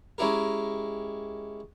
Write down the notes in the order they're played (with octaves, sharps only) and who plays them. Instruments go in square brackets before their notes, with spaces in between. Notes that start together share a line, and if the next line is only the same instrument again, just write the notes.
[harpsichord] G#3 C#4 E4 G4 A#4